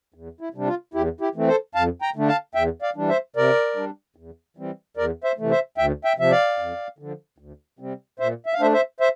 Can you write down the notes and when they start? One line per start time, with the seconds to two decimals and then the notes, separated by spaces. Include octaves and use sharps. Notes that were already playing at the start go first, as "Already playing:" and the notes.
0.14 E2
0.41 E4
0.54 C3 G3 D4
0.67 F4
0.94 E2 E4 G4
1.21 E4 G4
1.35 E3 A3 C4
1.48 A4 C5
1.75 F2 F5 A5
2.02 G5 A#5
2.16 D3 A3 D4
2.28 F5 A5
2.55 E2 E5 G5
2.82 D5 F5
2.95 E3 G3 D4
3.09 C5 E5
3.36 C3 A#4 D5
3.76 G3 D4
4.16 E2
4.57 E3 G3 C4
4.97 E2 A#4 D5
5.24 C5 E5
5.38 C3 E3 A3
5.51 C5 E5
5.78 D2 E5 G5
6.05 E5 G5
6.18 C3 F3 E5
6.31 D5 F5
6.59 F2
6.99 D3 F3
7.38 D2
7.79 C3 G3 C4
8.19 A#2 C5 E5
8.46 E5
8.54 F5
8.59 A3 D4 C5 E5
8.73 C5 E5
9.00 C5 E5